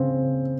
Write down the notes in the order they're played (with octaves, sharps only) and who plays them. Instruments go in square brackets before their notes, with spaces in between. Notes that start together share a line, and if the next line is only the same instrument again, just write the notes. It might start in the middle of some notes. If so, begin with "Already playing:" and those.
Already playing: [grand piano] C#3 C4